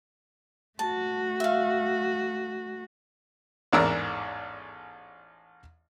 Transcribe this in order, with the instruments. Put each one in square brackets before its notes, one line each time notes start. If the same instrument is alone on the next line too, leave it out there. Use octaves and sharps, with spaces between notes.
[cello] A3 F#4 [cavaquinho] A5
[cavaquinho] E5 F5
[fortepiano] A1 E2 G#2 D4 A#4 E6